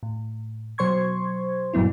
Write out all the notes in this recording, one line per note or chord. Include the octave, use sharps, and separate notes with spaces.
A2
B2 F#3 C5 C6 C#6 G#6
G2 A#2 F#3 B3 E4